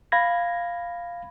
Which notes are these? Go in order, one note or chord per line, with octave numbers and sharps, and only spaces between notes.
F5 B5 G#6 A#6